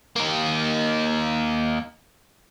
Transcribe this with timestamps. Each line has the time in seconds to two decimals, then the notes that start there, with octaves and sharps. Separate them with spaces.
0.16 A#3 D#4